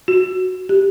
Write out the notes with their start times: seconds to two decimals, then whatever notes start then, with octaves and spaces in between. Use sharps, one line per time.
0.08 F#4
0.69 G4